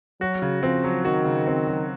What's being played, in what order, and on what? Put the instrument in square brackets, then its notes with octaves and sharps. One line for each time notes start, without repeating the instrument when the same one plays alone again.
[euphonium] F#3 [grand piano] F#4
[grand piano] C#3
[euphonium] F3 [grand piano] C4
[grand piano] F#3
[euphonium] D#3 [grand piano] F#4
[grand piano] C#3
C4
F#3